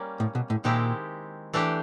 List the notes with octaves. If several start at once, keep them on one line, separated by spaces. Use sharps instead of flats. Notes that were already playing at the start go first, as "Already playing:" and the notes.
Already playing: G3 A#3 C#4
A2
B2
A2
A#2 D#3 G#3 C4 E4 G4
E3 A3 D4 G4